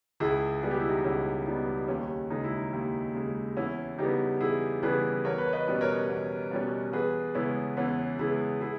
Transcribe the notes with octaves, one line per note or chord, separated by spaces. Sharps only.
C#2 E4 G#4
B2 G3 B3 G#4
G4
E4
D#4 G4
C#2 C#4 E4
B2 G3 B3 D#4
D#2 C#4
C#3 G#3 D#4
E4
D#4
D#2
C#3 G#3
E2 C#4 E4
C#3 E3 G3 B3 D#4 G4
E2 E4 G#4
C#3 E3 G3 B3 G#4 B4
E2 A#4 C#5
B4
C#5
B4 D#5
B2 G3 C#4
A#4 C#5
E2
B2 G3 C#4
E2 G#4 B4
C#3 G#3 B3 C#4 E4
E2 C#4 E4
C#3 G#3 B3 E4 G#4
E4 G#4